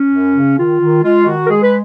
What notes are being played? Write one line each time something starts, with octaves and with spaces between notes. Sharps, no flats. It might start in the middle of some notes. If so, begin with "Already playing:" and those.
Already playing: C#4
F#2
C#3
D#3 F4
D#3
G#3 F4
D#3 F#4
A#4
G#3 G#4
B4